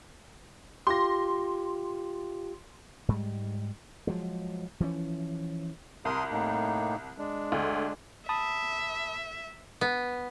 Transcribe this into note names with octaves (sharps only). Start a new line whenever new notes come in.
F4 G4 C6 A#6
G#2 G3 G#3
F3 F#3 G#3
E3 F3 A3 C#4
C2 A#4 C6 D#6
A2 A#3 D#4
G#3 D4
D2
E5 A5 B5 D#6
B3